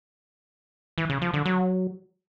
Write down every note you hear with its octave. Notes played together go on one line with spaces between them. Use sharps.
E3
C#3
F3
D3
F#3